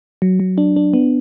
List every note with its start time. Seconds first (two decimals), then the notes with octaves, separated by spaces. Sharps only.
0.22 F#3
0.40 F#3
0.58 D4
0.76 D4
0.94 B3